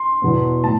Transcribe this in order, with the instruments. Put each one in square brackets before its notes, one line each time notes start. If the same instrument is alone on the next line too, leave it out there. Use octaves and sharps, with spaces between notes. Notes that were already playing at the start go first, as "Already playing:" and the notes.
Already playing: [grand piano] C6
E2 B2 B3
A2 A5